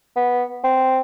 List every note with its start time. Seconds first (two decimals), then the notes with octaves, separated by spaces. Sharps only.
0.16 B3
0.64 C4